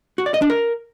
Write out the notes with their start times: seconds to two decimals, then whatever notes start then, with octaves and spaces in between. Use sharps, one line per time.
0.18 F#4
0.26 D5
0.34 D#5
0.42 D4
0.50 A#4